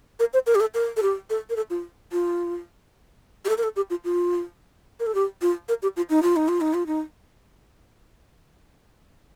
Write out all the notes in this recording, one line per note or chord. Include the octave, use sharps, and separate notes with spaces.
A#4
C5
A#4
G4
A4
A#4
A4
G4
A4
A#4
A4
F4
F4
G4
A4
A#4
A4
G4
F4
F4
A#4
A4
G4
F4
A#4
G4
F4
D#4
F4
D#4
F4
D#4
F4
D#4